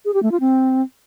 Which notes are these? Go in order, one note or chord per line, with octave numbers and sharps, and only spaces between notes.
G#4
G4
A3
F4
C4